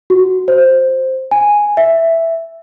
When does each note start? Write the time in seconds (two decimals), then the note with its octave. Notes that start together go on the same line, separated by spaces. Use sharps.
0.10 F#4
0.48 C5
1.31 G#5
1.77 E5